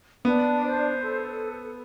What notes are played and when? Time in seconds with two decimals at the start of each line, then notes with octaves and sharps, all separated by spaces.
0.25 B3 D4
0.64 C5
1.02 A4